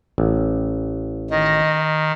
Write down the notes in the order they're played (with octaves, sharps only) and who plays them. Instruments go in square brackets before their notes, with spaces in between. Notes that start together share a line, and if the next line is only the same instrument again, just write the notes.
[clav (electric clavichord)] A1
[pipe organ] D#3 [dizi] D#5